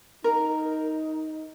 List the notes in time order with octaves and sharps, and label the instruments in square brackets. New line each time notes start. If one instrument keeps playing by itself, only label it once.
[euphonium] D#4 [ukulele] A#4